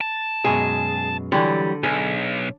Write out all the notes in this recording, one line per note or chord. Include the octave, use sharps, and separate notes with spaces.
A5
F#2 B2 G#3 G#4
D3 E3 F#3 G3
B1 G#4